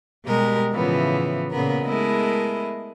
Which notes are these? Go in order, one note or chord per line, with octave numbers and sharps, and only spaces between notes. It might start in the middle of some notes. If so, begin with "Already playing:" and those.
B2 G3 G#3 G4 A#4
A2 C#3 E3 F3 B3
A#2 C#3 B3 A#4
G#3 A3 B3 E4 A#4 D#5